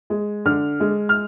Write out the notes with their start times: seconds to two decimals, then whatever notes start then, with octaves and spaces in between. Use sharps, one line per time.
0.10 G#3
0.45 D3 F6
0.80 G#3
1.09 F6